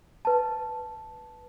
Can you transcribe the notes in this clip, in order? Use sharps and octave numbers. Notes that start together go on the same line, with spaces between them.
B4 A5